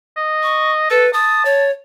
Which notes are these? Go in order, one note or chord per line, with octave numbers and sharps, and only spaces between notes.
D#5
C#6
A4 B4
A5 D#6
C#5